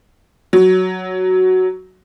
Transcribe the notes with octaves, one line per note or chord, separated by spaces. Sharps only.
F#3